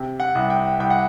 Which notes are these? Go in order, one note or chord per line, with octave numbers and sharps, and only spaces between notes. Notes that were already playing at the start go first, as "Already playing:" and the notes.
Already playing: C3
F#5
C2
G5
C2 G5
F#5